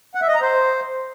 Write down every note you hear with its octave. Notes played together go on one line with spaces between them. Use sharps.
F#5
E5
D#5
A#5
C5